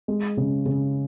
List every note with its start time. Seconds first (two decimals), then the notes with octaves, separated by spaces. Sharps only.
0.08 G#3
0.37 C#3
0.65 C#3